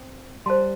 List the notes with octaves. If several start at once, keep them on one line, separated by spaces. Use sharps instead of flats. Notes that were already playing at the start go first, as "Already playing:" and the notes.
Already playing: C4
G3 C5 A5 C6